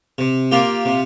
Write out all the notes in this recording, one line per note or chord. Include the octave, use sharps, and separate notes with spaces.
C3
A#3 F4 G4
C3